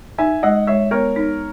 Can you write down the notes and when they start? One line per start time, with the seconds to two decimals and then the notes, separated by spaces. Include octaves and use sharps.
0.18 D#4 E5 G#5
0.43 G#3 D#5 F#5
0.67 G#3 C#5 E5
0.91 B3 A#4 C#5
1.16 D#4